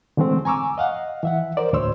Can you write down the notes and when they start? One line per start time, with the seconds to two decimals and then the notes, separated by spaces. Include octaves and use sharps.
0.17 D3 E3 G#3 A3 C4
0.45 G#5 A#5 C#6 D6 E6
0.78 D#5 F5 F#5
1.23 E3 E5 F#5
1.57 A#4 C5 D5
1.73 D2 A2 C5 C#5 C6 E6